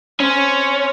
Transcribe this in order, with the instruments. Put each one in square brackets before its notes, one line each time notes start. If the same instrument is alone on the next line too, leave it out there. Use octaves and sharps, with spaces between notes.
[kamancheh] C4 C#5 [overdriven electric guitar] C#4